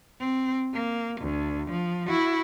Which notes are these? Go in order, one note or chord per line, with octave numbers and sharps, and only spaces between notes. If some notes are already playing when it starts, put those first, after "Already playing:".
C4
A#3
D2
F3
E4 F#4